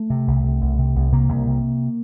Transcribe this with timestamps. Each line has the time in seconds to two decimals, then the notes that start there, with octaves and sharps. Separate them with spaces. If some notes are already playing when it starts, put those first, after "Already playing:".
Already playing: A3
0.10 C3
0.28 C2
0.44 C3
0.61 C2
0.79 C3
0.96 C2
1.13 C3 A#3
1.29 C2
1.47 C3